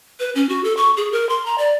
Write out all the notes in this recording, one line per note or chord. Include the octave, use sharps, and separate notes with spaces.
B4
C#4
F#4
A4
C#6
G#4
A#4
C6
A#5
D5